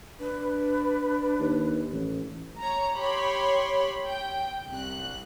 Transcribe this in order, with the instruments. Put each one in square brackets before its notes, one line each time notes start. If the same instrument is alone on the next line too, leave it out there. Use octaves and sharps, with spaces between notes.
[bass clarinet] D4 [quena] B4
[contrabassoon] D#2
A1
[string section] C#5 A#5
G4 C#5 B5 C6
G5
C2 F#6